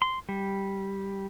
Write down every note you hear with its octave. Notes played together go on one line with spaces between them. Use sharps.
C6
G3